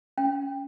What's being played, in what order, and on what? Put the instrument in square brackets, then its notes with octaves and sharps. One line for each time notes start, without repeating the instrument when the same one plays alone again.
[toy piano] C#4 G5